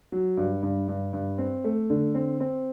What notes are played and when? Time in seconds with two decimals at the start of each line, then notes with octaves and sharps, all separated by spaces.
0.12 F#3
0.37 G2
0.63 G2
0.88 G2
1.13 G2
1.38 C4
1.64 A3
1.90 D3
2.14 C4
2.40 C4